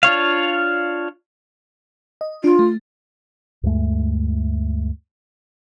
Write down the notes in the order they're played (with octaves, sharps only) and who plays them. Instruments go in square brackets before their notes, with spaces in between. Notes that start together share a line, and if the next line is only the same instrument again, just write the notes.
[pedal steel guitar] D4 F4 C#5 F5
[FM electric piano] D#5
[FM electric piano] D4 [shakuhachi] F4
[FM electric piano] A3
[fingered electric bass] D2 G2 G#3 A3